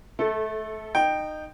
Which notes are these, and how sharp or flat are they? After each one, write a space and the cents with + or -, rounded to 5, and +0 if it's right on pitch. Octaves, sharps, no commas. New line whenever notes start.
A3 -25 A4 +0
D#4 -20 G5 +0